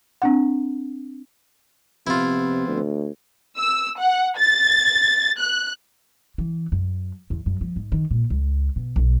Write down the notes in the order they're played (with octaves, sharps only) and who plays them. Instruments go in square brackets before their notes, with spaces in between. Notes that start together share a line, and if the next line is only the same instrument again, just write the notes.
[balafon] C4 D4 F#5
[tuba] C3 [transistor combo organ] F3 B3 C4 [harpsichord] E4 F4
[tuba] D2
[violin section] E6
F#5
A6
F#6
[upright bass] E3
F#2
E2
F#2
F3
G#2
D#3
A#2
C#2
B2
B1